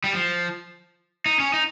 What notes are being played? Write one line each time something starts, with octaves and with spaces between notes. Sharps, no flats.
G3
F3
D#4
C#4
D#4